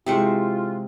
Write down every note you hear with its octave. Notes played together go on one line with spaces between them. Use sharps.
C3 E3 G#3 F4 C5 C#6